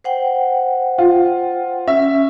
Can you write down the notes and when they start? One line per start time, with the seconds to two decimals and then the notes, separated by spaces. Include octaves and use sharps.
0.04 C5 F#5 G5
0.98 F4
1.88 C#4 E5